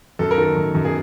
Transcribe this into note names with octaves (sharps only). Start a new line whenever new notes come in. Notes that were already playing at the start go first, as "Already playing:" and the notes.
F#2 A4
A#4
D#3 A4
F#2
F#2
G#4